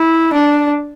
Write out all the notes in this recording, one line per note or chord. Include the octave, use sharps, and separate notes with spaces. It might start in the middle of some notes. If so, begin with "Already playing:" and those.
Already playing: E4
D4